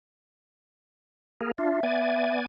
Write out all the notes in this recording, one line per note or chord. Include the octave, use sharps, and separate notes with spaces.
A#3 G#4 A#4
D4 F4 E5
B3 D5 G#5